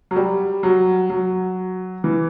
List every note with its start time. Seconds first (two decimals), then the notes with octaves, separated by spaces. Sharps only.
0.11 F#3
0.16 G3
0.63 F#3
1.10 F#3
2.04 E3